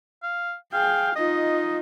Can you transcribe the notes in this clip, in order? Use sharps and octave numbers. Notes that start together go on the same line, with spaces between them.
F5
G#4 F5 G5
D#4 F4 D#5